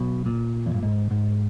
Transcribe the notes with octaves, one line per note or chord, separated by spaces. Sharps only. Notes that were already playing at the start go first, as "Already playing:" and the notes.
Already playing: B1 B2
A#2
E2
G2
G#2
G#2